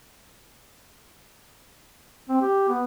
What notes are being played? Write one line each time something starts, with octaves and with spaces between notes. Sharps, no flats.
C4
G4
B3